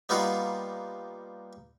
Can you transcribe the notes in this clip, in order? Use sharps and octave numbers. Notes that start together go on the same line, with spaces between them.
G3 A#3 B3 D#4 F4 F#4